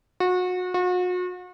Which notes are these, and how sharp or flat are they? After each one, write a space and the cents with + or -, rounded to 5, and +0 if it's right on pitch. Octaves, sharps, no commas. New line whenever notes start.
F#4 -30
F#4 -40